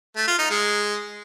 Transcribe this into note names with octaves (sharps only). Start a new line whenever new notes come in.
A3
F4
D#4
G#3